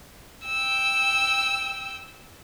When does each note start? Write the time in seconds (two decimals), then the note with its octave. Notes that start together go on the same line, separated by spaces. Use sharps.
0.45 G5 E6